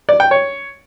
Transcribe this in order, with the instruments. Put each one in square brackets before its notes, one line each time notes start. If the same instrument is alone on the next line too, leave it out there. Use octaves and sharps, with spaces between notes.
[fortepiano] D5
G5
C#5